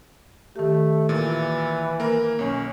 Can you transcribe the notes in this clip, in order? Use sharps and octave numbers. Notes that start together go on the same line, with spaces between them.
D#3 A3 G4
A#2 E3
A#3 A#4
B1 C#4